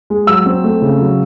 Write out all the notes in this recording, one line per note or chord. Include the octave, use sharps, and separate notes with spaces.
G#3
F#3 E6
C4
A3
C#3
F#3